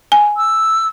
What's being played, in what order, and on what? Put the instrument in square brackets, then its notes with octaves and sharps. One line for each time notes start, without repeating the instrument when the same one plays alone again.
[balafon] G#5
[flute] E6